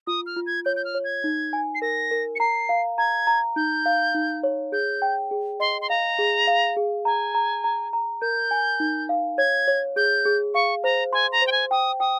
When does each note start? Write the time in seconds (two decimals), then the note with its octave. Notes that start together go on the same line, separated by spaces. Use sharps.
0.07 F4 D#6
0.26 F6
0.36 F4
0.46 G#6
0.65 C#5 G6
0.76 G6
0.85 F6
0.95 C#5
1.04 G#6
1.24 D#4
1.53 G#5
1.75 C7
1.82 A#4 A#6
2.11 A#4
2.35 C#7
2.40 A#5 C7
2.69 F5
2.98 A#5 G#6
3.27 A#5
3.56 D#4 G6
3.86 F5
4.14 D#4
4.43 C#5
4.72 G#4 G6
5.02 G5
5.31 G#4
5.60 D#5 C6
5.81 C6
5.90 F5 A#5
6.19 G#4
6.47 F5
6.77 G#4
7.05 G#5 A#5
7.35 A#5
7.64 A#5
7.93 A#5
8.22 A#4 G6
8.51 G#5
8.80 D#4
9.09 F5
9.38 C#5 G#6
9.68 C#5
9.96 G#4 G6
10.25 G#4
10.54 F5 C#6
10.84 C5 A#5
11.13 G#5 C6
11.32 A#5
11.42 C5
11.47 G5
11.52 G#5
11.71 G5 D#6
12.00 G5 D#6